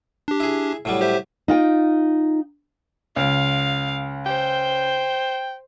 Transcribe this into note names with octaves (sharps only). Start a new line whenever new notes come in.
D4 G4
E4 G#4
A2 F#3 G3
G4 C5 E5
D#4 F4 G5
C#2 F5
C5 G5